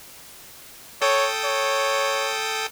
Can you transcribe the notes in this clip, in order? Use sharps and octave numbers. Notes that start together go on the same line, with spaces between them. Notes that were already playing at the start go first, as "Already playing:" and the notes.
A4 C#5 G5 D#6
C#5